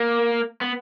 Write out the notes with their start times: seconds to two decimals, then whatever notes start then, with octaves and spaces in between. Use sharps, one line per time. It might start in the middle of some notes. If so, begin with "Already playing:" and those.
Already playing: A#3
0.61 B3